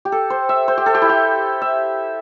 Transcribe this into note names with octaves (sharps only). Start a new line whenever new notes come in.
G4
A4
C5
E5
C5
G4
A4
G4
E4
G4
E5